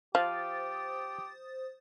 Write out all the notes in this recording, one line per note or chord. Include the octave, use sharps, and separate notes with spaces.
F3 G4 C5 F5 D#6 A6